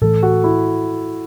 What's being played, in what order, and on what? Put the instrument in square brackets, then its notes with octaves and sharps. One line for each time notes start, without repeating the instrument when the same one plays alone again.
[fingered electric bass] A2 E3 A3 [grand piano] A4
[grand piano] F#4
E4